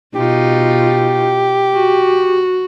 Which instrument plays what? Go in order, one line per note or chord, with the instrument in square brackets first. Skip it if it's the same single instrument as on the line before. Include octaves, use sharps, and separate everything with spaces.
[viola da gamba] B2 D#4 F4 [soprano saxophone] G4
[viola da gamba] F#4